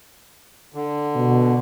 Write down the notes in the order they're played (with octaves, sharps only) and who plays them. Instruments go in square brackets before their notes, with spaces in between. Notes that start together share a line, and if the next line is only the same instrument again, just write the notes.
[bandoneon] D3
[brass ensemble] B2